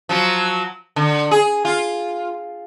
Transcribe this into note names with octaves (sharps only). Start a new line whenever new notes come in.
F3 F#3
D3
G#4
F4